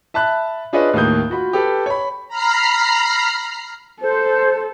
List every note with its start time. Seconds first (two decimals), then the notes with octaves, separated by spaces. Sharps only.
0.14 E5 A5 B5 F#6
0.73 D4 F4 G#4 B4 C#5 D#5
0.93 D#2 A2 A#3 D#6 G6
1.30 F4 F#4 B5
1.53 G4 A4 B4
1.86 C#5 B5
2.28 A#5 B5 F6 C7
4.01 A4 C5